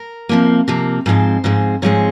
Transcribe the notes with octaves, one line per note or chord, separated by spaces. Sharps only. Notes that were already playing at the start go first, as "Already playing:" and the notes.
Already playing: A#4
C3 F3 A#3
C3 F3 A#3
G#2 F3 G#3 C4 C5
G#2 F3 G#3 C4
G#2 F3 G#3 C4 C#5